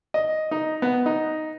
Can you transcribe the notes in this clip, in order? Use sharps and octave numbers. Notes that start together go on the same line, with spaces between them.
D#5
D#4
B3
D#4